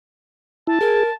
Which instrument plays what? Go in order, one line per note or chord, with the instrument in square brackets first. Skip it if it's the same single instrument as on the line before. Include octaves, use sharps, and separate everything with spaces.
[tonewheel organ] E4 [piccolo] A5
[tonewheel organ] G#4 [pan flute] A#4